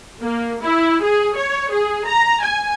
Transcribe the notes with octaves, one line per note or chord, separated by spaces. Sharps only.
A#3
E4
G#4
C#5
G#4
A#5
G#5